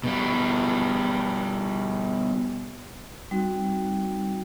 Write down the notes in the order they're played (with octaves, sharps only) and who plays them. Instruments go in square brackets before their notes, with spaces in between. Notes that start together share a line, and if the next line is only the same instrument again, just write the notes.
[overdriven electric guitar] B2 G3
[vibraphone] G3 C4 D#4 F#4